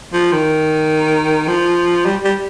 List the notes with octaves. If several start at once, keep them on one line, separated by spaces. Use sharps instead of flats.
F3
D#3
F3
G3
G3